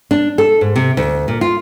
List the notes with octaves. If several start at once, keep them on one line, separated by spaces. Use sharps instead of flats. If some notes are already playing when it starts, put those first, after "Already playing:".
D4
A4
G#2
C3
D2
A#2
F4